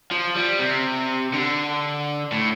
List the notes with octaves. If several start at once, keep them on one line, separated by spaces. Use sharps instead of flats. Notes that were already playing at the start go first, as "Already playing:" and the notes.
F3
G3
C3
D3
A2